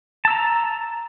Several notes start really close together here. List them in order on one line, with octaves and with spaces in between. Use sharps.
A5 E6 A#5